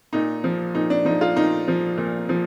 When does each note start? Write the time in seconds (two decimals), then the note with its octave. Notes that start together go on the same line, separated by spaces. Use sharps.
0.13 A#2 D#4
0.44 F3
0.75 A#2 D#4
0.90 D4
1.05 F3 D#4
1.21 F4
1.36 A#2 D#4
1.68 F3
1.97 A#2
2.29 F3